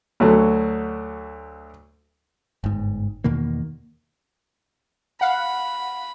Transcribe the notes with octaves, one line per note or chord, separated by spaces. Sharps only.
D2 F#3 A3
G1 G#2
E2 B2 D#3 A#3
F5 F#5 B5